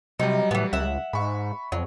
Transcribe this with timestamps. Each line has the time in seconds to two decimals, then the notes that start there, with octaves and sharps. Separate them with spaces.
0.20 C3 F#3 G3 D#4
0.51 A2 E3 B3
0.73 C#2 E5 F#5
1.13 G#2 B5 C#6
1.72 F2 F#3